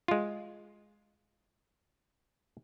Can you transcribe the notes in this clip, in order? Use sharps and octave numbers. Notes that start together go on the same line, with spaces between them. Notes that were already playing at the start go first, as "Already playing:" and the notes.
G#3 F4